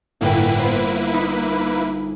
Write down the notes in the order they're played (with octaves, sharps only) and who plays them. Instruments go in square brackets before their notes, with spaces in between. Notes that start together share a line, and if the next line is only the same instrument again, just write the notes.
[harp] G1 A2 G5 [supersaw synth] A#3 E4 B4
[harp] B3 C5
D#4 B5 B6